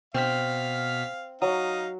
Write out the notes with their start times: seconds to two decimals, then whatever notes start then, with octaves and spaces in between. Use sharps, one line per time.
0.14 B2 C4 F5 F6 B6
1.42 F#3 D#4 F5 D#6